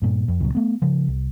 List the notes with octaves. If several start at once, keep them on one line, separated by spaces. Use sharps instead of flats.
G2 A#2
F2
C#2 A#2 F#3
A3 B3
C#3 F3
C2